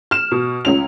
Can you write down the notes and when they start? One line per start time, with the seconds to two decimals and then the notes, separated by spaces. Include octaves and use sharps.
0.11 F6 E7
0.32 B2
0.65 C#2 C#4 F7